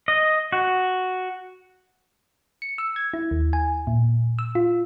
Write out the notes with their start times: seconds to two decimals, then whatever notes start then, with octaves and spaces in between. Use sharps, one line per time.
0.08 D#5
0.52 F#4
2.62 C#7
2.78 E6
2.96 G#6
3.14 E4
3.31 D#2
3.53 G#5
3.87 A#2
4.39 E6
4.55 F4